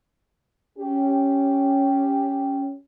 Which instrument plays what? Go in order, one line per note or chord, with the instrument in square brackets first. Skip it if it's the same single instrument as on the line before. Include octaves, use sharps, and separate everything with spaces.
[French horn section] C#4 G4